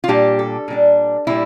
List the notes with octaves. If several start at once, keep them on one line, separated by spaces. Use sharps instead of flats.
F4
A#2 G3 D4 G4
A4
A#2 G3 D4
A#2 G3 E4